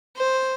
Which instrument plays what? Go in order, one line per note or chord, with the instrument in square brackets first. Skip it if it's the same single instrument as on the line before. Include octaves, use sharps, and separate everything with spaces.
[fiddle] C5